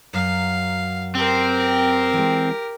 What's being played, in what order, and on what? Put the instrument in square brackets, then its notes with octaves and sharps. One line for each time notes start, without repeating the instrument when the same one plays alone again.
[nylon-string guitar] F#2 F#3 [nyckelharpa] F5
[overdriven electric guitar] C4 [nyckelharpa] G4 A#4
[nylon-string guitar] E3 G#3